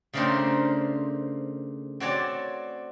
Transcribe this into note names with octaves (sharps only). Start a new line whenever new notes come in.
C#3 A3 C4 D4 A#4 C5
C4 F#4 C#5 D5 A5